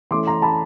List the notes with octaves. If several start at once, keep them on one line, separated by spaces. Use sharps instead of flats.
E3 A3 C#4 C6 D6
A#5 C6
A5 B5